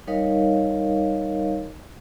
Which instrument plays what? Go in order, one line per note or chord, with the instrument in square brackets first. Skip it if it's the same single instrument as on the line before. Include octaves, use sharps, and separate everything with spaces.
[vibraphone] G3 D#4 A#4 C#5 D#5 F5